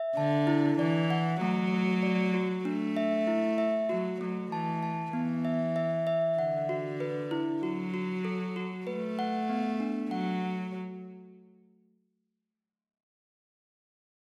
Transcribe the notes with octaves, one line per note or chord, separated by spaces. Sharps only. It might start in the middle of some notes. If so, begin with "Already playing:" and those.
Already playing: E5
D3 A5
E4
E3 D5
F#5
F#3 A3
A3
D5
F#4
A3 D4
E5
E4
E5
F#3 F#4
F#3 A3
E3 A5
A5
E3 B3
E5
E5
E5
D3 F#5
F#4
B4
E4
F#3 F#4
F#4
A4
F#4
A3 B4
F#5
B3
D4
F#3 F#5